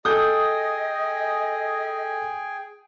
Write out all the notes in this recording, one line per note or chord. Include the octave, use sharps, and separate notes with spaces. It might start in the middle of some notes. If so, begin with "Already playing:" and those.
G#4 A4 D#5 G5 G#5 D#6 G6